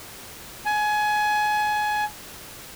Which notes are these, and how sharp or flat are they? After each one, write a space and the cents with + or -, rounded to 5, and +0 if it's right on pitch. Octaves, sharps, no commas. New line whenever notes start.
G#5 +25